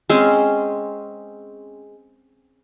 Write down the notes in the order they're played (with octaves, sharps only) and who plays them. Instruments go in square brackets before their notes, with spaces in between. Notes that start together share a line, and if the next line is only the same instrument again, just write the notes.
[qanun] G#3 C4 C#4